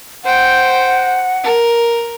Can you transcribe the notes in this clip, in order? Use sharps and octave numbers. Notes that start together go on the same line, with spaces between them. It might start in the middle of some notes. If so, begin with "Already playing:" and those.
C5 F#5 G5
A#4